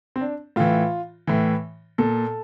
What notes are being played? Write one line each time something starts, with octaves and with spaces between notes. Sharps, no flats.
C4
D4
A2 E3 F4
A2 E3
A#2 A4